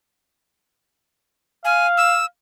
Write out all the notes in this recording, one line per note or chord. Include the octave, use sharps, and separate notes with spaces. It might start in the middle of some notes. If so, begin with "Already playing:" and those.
F5 G#5
E6